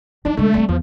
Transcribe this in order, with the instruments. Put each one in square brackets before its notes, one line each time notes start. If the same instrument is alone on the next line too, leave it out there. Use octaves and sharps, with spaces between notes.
[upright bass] F#3 D#4 [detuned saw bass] D4
[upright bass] D3 G#3 [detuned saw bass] A3
[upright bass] G3 C4
[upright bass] E2 [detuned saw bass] F3